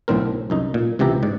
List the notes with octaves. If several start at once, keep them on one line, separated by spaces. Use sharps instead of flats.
B1 A2 D3 C4 A#4
C2 F#2 D#4
A#2
C#2 C3 E3 G4 E5 A#5
G#2 D5